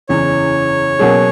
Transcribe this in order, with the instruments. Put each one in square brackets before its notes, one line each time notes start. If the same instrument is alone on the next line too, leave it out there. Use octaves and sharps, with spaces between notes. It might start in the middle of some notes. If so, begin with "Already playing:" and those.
[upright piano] F#1 E2 C#3 E3 [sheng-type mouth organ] C#5
[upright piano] B2 F#3 A#3 C#4 G#4